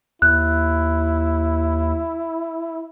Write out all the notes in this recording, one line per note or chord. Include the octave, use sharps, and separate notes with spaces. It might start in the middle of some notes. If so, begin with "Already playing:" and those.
D#2 E4 F#6